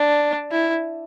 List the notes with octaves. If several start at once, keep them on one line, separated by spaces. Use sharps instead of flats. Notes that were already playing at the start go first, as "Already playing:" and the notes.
Already playing: D4
E4